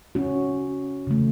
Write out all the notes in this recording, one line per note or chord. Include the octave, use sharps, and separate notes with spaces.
C#4 F#4
C#3 E3 A3